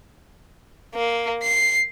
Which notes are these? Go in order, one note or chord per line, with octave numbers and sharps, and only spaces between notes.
A#3
C7